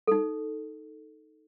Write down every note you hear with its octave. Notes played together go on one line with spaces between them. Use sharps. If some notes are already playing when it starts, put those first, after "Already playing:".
D#4 A4